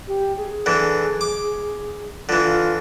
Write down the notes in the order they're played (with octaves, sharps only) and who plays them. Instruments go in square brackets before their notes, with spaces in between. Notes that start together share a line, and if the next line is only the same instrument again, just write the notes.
[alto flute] G4
G#4
[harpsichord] D3 E3
D6
[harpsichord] D3 E3 [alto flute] F4
[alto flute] F4